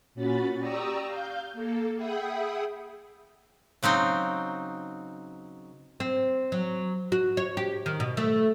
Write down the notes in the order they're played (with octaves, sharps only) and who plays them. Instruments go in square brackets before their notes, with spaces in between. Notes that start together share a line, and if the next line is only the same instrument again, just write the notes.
[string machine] A#2 C#4 F#4 B5 A6
G4 D5 A#5 C#6 D#6 E6
F5 G6
A#3 A4
G#4 E5 F#5 G5 B5 D#6
[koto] C#3 F#3 C4 D#4
[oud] C4
F#3
F#4
C#5
G4
D#3
B2
A3